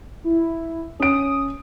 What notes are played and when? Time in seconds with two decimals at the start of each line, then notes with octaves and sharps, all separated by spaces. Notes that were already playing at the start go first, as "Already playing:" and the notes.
0.24 E4
1.00 C#4 D#6 D7